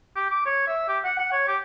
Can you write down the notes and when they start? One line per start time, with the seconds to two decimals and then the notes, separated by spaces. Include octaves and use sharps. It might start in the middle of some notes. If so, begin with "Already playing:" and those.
0.16 G4
0.30 D6
0.45 C#5
0.67 E5
0.88 G4
1.04 F#5
1.19 F#5
1.32 C#5
1.48 G4